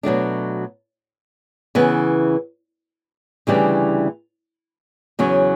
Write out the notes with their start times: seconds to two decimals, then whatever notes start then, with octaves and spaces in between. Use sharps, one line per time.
0.03 B2 F#3 A3 D4
1.75 C#3 E3 B3
3.47 D2 C#3 E3 G3 D4
5.19 E2 C#3 F#3 C#4